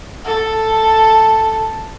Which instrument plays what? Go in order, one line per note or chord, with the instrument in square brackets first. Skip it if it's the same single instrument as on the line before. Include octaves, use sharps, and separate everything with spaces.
[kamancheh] A4 A5